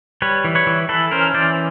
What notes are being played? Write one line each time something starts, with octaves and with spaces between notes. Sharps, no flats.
G3 B4 C#5
E3
B4 C#5
E3
E3 A4 B4
C#4 A#4 C5
E3 C5 D5